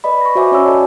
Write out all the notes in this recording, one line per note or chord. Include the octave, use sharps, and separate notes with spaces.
B4 D5 D#5 B5
C#6 A#6
F#4 C5 E5 G#5 B5 D6
C#4 F#4 C#5 D5 G#5 E6
A4 D5 D#5 G#5 A5